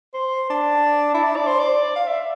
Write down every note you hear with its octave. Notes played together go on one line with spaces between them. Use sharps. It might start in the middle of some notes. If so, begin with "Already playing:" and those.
C5
D4
E4
D4
D5
C5
D5
F5
E5